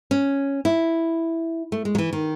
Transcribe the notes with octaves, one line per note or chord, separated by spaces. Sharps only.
C#4
E4
A3
G#3
F#3
E3
D#3